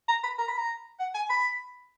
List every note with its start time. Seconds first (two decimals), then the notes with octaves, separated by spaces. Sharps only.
0.08 A#5
0.24 B5
0.38 A#5
0.48 B5
0.57 A#5
1.00 F#5
1.15 G#5
1.30 B5